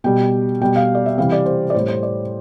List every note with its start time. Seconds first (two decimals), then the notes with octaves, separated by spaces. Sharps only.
0.04 B2 G3 G5
0.61 B2 G3 G5
0.76 F5
0.95 D5
1.06 E5
1.18 C3 E3 G3 F5
1.32 D5
1.46 C5
1.70 D5
1.74 A2 G3 C5
1.88 C5
2.03 D5